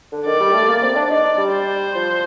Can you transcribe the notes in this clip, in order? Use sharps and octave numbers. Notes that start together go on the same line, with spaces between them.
D3
D#3 D5
G3
A3
A#3
C4
D4
D#4 D5
D4
G3
C5
F3